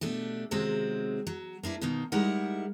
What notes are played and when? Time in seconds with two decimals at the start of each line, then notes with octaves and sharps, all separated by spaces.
0.01 B2 A3 D4 G4
0.51 C3 D#3 F#3 G#3 C4
1.27 F#3
1.63 A#3 D4 E4 B4
1.81 B2 D#3 A#3 D#4
2.12 G3 G#3 D#4 E4 A#4 F#5